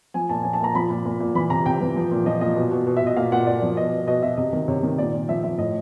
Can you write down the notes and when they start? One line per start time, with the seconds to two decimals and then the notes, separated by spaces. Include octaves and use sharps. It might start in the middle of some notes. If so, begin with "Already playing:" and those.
0.14 F3 G#5
0.29 A#2 A5
0.43 F3 G#5
0.53 A5
0.60 A#2 A#5
0.75 F3 B5
0.90 A#2
1.05 A#2
1.20 A#2
1.35 E3 B5
1.50 C3 A#5
1.66 C3 G5
1.81 E3
1.96 F3
2.11 A#2
2.26 F3 D#5
2.41 A#2 D#5
2.56 B2
2.71 B2
2.87 B2
2.97 E5
3.02 B2 D#5
3.17 A#2 F5
3.32 A#2 F#5
3.47 A#2 D5
3.63 F3
3.77 B2 D#5
3.93 B2
4.07 B2 D#5
4.22 B2 E5
4.37 C3 D#5
4.53 D#3
4.68 C3 C#5
4.83 D#3
4.98 A#2 D5
5.13 A#2
5.29 F3 E5
5.44 F3 E5
5.58 A2 D#5